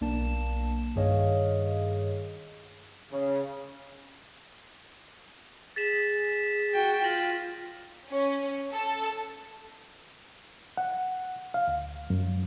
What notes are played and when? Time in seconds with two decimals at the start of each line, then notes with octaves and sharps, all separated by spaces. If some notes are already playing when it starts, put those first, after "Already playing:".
0.01 B1 A#3 D4 A5 E7
0.96 G2 D#3 G#4 C#5 D#5 F5
3.12 C#3
5.76 G#4 A6 B6 E7
6.74 F#4 G5
7.04 F4 A#6 F#7
8.09 C#4
8.73 A4
10.77 F#5
11.54 F5
11.68 D2
12.10 F#2